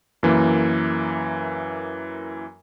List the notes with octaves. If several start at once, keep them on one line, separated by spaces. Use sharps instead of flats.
F#2 E3 A#3